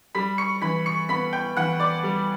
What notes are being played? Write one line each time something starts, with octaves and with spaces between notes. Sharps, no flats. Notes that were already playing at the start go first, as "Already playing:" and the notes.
G3 B5 B6
C#6 C#7
E3 B5 B6
C#6 C#7
B3 B5 B6
G5 G6
E3 F#5 F#6
D5 D6
G3